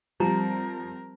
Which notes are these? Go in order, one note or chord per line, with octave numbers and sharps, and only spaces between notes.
F3 G3 C4 A#4 A#5